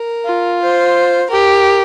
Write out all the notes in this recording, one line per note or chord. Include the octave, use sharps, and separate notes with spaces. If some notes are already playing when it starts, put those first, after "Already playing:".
Already playing: A#4
F4
C5
G4 A#4